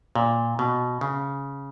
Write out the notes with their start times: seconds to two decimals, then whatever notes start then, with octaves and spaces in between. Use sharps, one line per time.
0.16 A#2
0.59 B2
1.01 C#3